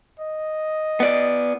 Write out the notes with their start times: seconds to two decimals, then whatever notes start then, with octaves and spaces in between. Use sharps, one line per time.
0.20 D#5
1.00 B3 D5